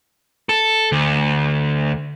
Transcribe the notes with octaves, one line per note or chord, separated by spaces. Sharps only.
A4
D2